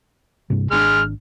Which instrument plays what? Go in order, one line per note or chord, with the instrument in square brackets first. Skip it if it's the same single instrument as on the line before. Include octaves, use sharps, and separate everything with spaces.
[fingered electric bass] G2 C3
[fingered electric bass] G#1 C#4 D4 [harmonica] G#3 F6